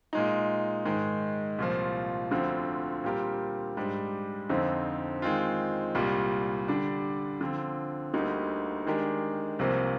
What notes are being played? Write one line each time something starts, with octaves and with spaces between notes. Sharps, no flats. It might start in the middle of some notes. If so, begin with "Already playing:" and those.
A#2 G#3 D#4
G#2 D#3 G#3
C2 A#2 F3
D2 D3 F3 C4
A#2 G3 C4 G4 A#4
G#2 G3 D4
F2 D3 F3 C4 D#4
D#3 G#3 C4 F4
C2 A#2 G3
D3 G3 D4
D3 F3 C4
D2 D3 G3 A#3 D#4
D#3 G#3 D4 G4 A#4
C2 C3 F3 A#3